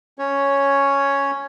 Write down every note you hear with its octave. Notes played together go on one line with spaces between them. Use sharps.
C#4 C#5